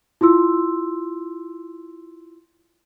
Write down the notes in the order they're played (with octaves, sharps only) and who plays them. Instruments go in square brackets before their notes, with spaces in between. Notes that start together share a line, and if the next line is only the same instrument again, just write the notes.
[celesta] E4 F4 C6 E6